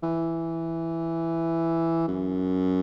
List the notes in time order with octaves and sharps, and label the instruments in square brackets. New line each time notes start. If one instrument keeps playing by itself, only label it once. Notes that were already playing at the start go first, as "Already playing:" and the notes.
[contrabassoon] E3
F#2